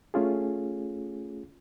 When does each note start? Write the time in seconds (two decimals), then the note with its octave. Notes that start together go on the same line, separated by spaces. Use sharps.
0.14 A3 C#4 F4 G#4